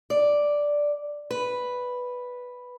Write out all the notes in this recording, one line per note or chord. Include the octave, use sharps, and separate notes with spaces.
D5
B4